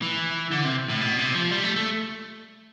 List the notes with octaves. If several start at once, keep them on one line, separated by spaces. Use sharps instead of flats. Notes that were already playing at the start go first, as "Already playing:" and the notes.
E3
D3
C3
A2
B2
C3
F3
G3
A3
A3